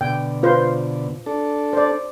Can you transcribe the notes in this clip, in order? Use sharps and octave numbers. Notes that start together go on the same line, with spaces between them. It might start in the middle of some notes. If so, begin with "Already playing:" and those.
B2 D3 G5
F4 B4 C5
D4 A4
C5 D5